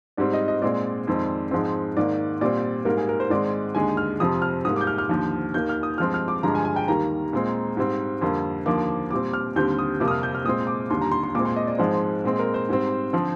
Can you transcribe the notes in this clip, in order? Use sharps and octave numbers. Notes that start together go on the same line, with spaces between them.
G#2 G3 C4 D5
D#5
D#5
A#2 G#3 C4 D5
F2 D#3 G#3 C4
G#2 F3 G#3 C4
G#2 D#3 A#3 D5
A#2 G3 C4 D5
G#2 G3 A#3 A#4
G#4
A#4
C5
G#2 D#3 G#3 C4 D5
D#2 D3 G#3 G#5
F6
F2 C3 F3 C4 D#6
F6
G#2 G3 A#3 D#6
D6
G6
F6
F6
D#2 D3 F3
D#2 D#3 A#3 G6
F6
D#6
G2 F3 G#3 C4 F6
F6
D6
G2 D3 F3 G#3 A#5
G#5
G#5
G5
D#2 D#3 G3 A#3 A#5
A#2 G#3 C4
G#2 G3 C4
F2 D3 G3 A#3 C6
D#2 D3 F3 A#3 D6
A#2 G3 C4 D6
F6
D#2 D3 G3 C4 G6
D#6
F2 C3 G3 A#3 D6
D#6
F6
G6
F6
A#2 G#3 C4 D#6
D6
D#2 D3 G3 C6
A#5
C6
C6
A#2 G#3 C4 D6
C6
D#5
D5
G#2 F3 G#3 C4 C5
A#2 G#3 C4
A#4
C5
G#2 G3 C4
D3 F3 C4